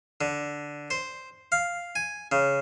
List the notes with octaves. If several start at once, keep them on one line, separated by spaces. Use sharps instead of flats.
D3
C5
F5
G#5
C#3